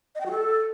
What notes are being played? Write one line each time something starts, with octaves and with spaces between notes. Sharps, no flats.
D#5
G5
F#4
A4